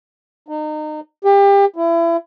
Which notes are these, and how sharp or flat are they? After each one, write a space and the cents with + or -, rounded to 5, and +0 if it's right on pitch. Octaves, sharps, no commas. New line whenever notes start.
D#4 -30
G4 +30
E4 +30